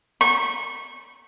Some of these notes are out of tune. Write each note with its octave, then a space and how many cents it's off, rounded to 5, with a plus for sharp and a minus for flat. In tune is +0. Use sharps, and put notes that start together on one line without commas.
C#6 -25